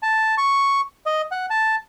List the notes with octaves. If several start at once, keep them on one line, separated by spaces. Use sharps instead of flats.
A5
C#6
D#5
F#5
A5